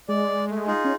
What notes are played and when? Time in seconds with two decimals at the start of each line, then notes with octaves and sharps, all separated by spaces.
0.09 G#3 D5
0.50 A3
0.67 D#4 F4 G#4
0.85 C#4